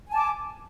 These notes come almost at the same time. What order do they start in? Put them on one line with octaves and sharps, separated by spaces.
G#5 A5 D6